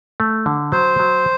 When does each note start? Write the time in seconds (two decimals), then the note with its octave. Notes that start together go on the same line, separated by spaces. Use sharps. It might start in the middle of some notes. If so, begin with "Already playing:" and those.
0.20 A3
0.46 D3
0.72 F#3 C5
1.00 F#3